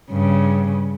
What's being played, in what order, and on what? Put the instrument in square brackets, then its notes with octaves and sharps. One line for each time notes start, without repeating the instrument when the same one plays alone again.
[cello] G2 C#3